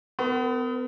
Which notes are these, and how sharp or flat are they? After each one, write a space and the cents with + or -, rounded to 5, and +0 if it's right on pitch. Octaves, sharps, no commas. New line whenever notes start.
B3 +35 A#4 -25